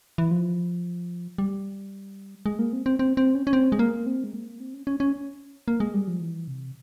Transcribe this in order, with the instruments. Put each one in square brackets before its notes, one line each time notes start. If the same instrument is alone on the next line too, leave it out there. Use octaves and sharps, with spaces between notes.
[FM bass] E3
F3
G3
G#3
A#3
C4
C4
C4
C4
C#4
C#4
C4
G#3
A#3
C4
G#3
A#3
C4
C#4
C#4
C#4
A#3
G#3
G3
F3
E3
C3